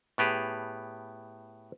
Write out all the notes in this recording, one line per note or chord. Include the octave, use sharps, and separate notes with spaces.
A2 B3 G4 G#4